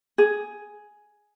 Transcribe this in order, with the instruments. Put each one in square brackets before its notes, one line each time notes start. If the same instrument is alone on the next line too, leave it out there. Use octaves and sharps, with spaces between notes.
[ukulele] G#4